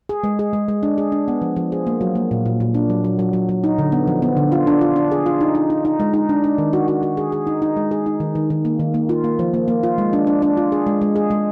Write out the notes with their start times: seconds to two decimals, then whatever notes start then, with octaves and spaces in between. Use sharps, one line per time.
0.09 G#4
0.24 G#3
0.39 G#4
0.53 G#3
0.68 G#3
0.83 D4
0.98 G#4
1.12 D4
1.28 B3
1.42 F3
1.56 F3
1.72 G#4
1.87 A#3
2.01 F#3
2.15 A#3
2.31 A#2
2.46 A#2
2.60 A#2
2.74 D4
2.90 F#3
3.04 F#3
3.19 F#3
3.33 F#3
3.49 F#3
3.64 D#4
3.78 D3
3.92 B3
4.07 F3
4.22 B3
4.37 D3
4.52 F4
4.67 D4
4.81 F4
4.96 D4
5.11 G#4
5.26 F4
5.41 D#4
5.55 D#4
5.70 D#4
5.85 D#4
6.00 G#3
6.14 D#4
6.29 D4
6.44 D4
6.58 D#3
6.73 F#4
6.88 F#4
7.03 F#4
7.17 G#4
7.32 G#4
7.47 D#4
7.62 D#4
7.77 G#3
7.91 G#4
8.06 D#4
8.20 D#3
8.35 D#3
8.50 D#3
8.65 A#3
8.80 D#3
8.94 A#3
9.09 F4
9.24 A#3
9.39 F3
9.54 A#3
9.68 A#3
9.83 F4
9.98 G#3
10.13 D4
10.27 D4
10.42 D4
10.57 F4
10.72 G#4
10.87 G#3
11.02 G#3
11.16 G#4
11.31 G#3